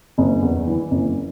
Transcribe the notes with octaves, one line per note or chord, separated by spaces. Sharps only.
F#1
E2
E3
F#1